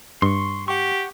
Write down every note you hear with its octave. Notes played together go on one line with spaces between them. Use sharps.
G2 C6 C#6
G4 F#5 C#6